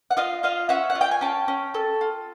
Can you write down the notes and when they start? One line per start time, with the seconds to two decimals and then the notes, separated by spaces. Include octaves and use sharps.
0.11 F#5
0.17 F4 D#5 F5
0.43 F4 D#5 F5
0.69 C#4 E5 F#5
0.90 F#5
0.95 F4
1.01 G5
1.11 G#5
1.21 C#4 G5 A5
1.48 C#4
1.74 A4
2.01 F4